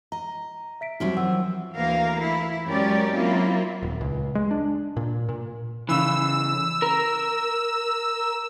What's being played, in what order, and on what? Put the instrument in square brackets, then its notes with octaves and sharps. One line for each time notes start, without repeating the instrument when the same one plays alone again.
[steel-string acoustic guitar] D#5 [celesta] A#5
[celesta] E5 B6 D7
[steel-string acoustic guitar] F#3 C4 A#4 [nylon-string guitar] G3 [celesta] D#4 F#4 E5
[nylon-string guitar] E3 F3 B4 [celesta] F#5 E6
[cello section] D2 E3 A#3 A#4 F5
E4
F#2 G#3 C#4 G4 A#4 D5
F#3 A#3 C4 E4 F4
[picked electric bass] D#1
C#2
G#3
D4
A#2
A#2
[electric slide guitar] C#3 E3 [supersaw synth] E6
[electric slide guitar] A#4